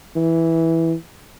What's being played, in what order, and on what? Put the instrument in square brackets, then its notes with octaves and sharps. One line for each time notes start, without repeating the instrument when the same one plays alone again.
[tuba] E3